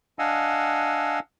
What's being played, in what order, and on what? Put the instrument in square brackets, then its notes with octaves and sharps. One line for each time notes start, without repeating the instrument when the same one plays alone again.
[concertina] D4 D#5 F5 F#5 G#5 E6